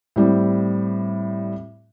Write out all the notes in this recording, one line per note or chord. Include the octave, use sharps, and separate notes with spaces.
A2 G3 C4